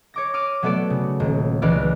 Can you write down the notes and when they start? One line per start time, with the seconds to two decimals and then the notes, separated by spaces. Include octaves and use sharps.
0.14 C#5 D6 A#6
0.34 D6 F6 D#7
0.63 F#3 A3 B3 A4 D5
0.90 C#3
1.20 D#1
1.62 C#2 E3 B4 D5 F6